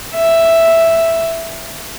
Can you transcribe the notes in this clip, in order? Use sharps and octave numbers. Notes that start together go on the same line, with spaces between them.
E5